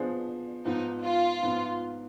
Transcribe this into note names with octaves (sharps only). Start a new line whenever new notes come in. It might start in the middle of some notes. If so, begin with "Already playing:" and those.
Already playing: F3 B3 D4 G#4 C5
G#2 F3 B3 D#4
F4
G#2 F3 B3